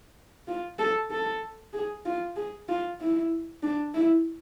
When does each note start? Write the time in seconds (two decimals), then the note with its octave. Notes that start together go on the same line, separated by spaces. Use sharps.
0.48 F4
0.79 A4
1.11 A4
1.73 G#4
2.06 F4
2.36 G#4
2.69 F4
3.00 E4
3.63 D4
3.94 E4